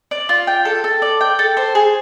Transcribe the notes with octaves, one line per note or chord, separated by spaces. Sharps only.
D5
F4
G5
A4
A4
D5
G5
A4
C5
G#4